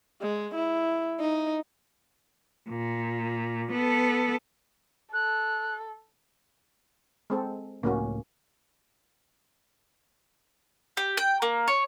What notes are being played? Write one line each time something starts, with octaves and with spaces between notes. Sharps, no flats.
G#3
E4
D#4
A#2
B3 A4
A4 F#6
G#3 C4 A4
C#2 A2 A#3 C#4 F#4
G4
G5
A#3
C#5